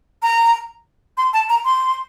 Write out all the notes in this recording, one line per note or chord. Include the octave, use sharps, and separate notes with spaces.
A#5
C6
A5
A#5
C6